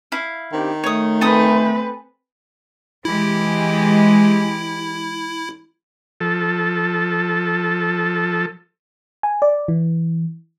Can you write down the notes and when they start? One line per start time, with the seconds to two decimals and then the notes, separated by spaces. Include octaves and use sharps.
0.12 E4 F5
0.52 D#3 C4 D4 G4
0.84 A3 C#5 D#6
1.21 C4 A4 B4 G#5 D#6
3.05 E3 G#3 E4 G4
6.21 F3 A4
9.23 G#5
9.42 D5
9.68 E3